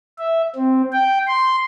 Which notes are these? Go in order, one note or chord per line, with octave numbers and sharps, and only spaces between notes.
E5
C4
G5
C6